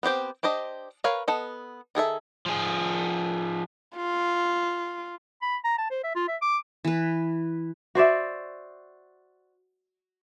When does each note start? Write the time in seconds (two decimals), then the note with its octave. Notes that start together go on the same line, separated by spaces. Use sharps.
0.03 B3 C4 G4 C5
0.43 D4 G4 C5 D#5
1.04 A#4 B4 C#5 F5
1.28 B3 A4 D#5
1.95 D#3 G#4 A4 E5
2.46 F3 G#4
3.96 F4
5.42 B5
5.64 A#5
5.78 A5
5.91 C5
6.04 E5
6.15 F4
6.28 E5
6.42 D6
6.84 E3 B4
7.95 F#4 C5 D5 E5